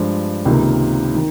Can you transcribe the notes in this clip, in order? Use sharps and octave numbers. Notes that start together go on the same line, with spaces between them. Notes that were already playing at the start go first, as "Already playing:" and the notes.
Already playing: G2 F3 G#3
C#2 C3 D#3 A#3 F4
D#3